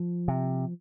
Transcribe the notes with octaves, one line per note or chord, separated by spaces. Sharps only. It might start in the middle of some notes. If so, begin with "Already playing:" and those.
Already playing: F3
C3